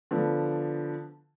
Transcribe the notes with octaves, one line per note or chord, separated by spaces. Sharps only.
D3 F3 B3